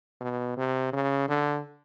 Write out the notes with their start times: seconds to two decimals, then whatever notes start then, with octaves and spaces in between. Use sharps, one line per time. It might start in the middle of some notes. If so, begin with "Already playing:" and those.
0.21 B2
0.57 C3
0.93 C#3
1.28 D3